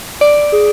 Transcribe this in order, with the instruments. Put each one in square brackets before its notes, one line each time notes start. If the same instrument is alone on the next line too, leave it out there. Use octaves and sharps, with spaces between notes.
[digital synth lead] D5
[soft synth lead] G#4